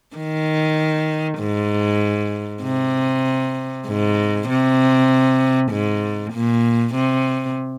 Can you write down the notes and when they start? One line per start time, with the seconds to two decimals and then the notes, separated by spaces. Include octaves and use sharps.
0.16 D#3
1.40 G#2
2.63 C3
3.87 G#2
4.49 C3
5.71 G#2
6.33 A#2
6.95 C3